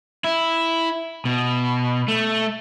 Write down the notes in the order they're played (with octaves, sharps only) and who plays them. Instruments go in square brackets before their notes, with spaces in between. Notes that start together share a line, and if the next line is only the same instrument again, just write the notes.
[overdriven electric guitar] E4
B2
A3